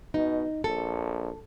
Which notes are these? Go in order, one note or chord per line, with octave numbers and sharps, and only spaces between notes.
B2 D#4
A#1 A4